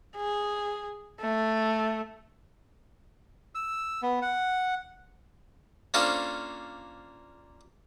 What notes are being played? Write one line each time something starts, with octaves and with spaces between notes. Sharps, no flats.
G#4
A3
E6
B3
F#5
A#3 C#4 D4 F4 A4 C5